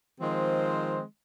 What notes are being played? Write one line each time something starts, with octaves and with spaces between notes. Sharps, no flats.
D#3 F3 G#3 C4 C5